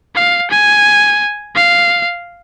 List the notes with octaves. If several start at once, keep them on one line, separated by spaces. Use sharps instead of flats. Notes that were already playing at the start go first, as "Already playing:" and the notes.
F5
G#5
F5